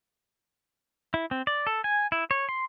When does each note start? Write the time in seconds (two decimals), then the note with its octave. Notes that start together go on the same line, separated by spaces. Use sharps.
1.14 E4
1.31 C4
1.47 D5
1.67 A4
1.84 G#5
2.12 E4
2.31 C#5
2.49 C6